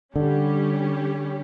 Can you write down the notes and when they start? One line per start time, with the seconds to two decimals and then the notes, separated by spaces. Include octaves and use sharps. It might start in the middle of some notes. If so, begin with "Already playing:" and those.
0.15 D3 G3 C#4 G4